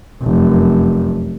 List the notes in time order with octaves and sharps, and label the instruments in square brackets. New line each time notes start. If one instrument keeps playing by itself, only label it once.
[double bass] F1 F#2